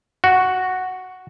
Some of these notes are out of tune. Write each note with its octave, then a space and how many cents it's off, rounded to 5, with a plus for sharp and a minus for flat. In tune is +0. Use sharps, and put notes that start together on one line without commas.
F#4 +0